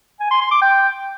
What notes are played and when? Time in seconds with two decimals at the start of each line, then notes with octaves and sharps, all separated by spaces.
0.20 G#5
0.31 C6
0.41 C6
0.51 D6
0.62 G5